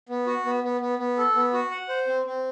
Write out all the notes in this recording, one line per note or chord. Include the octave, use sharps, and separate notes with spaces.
B3
F#4
B3
B3
B3
B3
A4
B3
F#4
F#5
C5
C4
C4